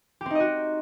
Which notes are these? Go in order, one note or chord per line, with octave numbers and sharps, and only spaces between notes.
C4 D#4 F#4 G4 D#5